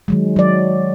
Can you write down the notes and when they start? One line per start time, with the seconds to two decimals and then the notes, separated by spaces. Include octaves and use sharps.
0.08 D#3 F#3 G#3
0.36 F#3 D5